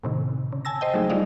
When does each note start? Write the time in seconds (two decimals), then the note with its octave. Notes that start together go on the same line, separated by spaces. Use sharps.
0.04 A2 C3 D#3
0.52 C#3
0.65 G#5 A5 E6 A#6
0.81 C5 D#5 G5
0.93 F#3 A3 D#4 G#4
1.10 G3 D#4 F4 D5 D#5 F5